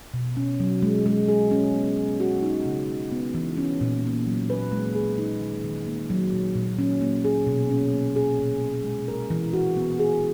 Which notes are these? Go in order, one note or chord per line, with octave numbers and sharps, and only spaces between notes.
B2
C#4
F#3
G#3
G#3
G#4
C#4
B3
B3
F#4
D#4
C#3
C#3
B3
E3
C#4
A#2
A#3
F#3
B4
G#3
G#4
D#4
D#3
D#3
A#3
F#3
A#2
A#2
C#4
A#3
G#4
B2
C#4
A#3
G#4
A#2
C#4
G#3
A#4
E3
F#4
B3
G#4